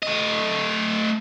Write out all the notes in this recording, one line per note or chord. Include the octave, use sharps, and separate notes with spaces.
A3 D#5